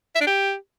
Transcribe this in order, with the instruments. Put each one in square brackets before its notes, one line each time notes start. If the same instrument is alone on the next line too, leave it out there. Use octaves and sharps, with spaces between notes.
[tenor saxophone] E5
D4
G4